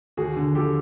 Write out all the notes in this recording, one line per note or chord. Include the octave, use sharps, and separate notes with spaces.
D#2 F#4 G#4
D3
F3 G4 A4